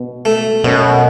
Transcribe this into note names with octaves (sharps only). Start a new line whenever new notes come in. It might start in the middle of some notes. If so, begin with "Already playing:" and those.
Already playing: B2
A3
F#2 B2